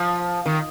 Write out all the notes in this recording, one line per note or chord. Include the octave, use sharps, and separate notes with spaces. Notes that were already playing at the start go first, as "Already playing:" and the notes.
Already playing: F3
D#3